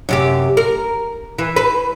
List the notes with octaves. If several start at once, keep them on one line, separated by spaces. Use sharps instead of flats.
F#2 C3 G4
A#4
E3
B4